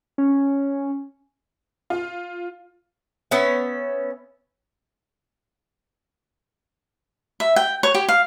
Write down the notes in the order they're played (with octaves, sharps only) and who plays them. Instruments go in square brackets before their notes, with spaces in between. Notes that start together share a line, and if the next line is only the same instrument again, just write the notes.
[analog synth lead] C#4
[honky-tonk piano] F4
[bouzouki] B3 C#4 E5
[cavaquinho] E5
G5
C#5
G4
F5